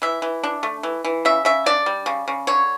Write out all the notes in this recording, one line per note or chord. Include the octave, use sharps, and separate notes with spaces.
E3 E5
E3
D4
A3
E3
E3
C#3 E5
C#3 E5
D4 D5
G3
C#3
C#3
D3 C#5